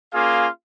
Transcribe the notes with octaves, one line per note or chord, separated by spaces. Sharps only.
A#3 C#4 F4 G#4 F5